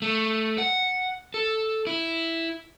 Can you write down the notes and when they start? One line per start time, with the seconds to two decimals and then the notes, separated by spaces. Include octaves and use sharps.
0.02 A3
0.58 F#5
1.34 A4
1.87 E4